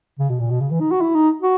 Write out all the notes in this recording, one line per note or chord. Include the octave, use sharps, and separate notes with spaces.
C#3
B2
A#2
B2
C#3
E3
D#4
F#4
E4
D#4
F#4